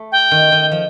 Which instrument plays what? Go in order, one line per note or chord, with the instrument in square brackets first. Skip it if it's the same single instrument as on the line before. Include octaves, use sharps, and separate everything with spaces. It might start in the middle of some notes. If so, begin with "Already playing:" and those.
Already playing: [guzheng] A3
[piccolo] G5
[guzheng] D#3
D#3
F3